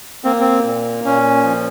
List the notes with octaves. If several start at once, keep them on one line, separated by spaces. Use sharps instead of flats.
A#3 C4
C4
A#2
A#2 C#4
F3